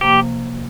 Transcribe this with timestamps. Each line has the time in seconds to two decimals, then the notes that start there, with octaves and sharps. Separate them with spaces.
0.01 C3 F3 A#3 G4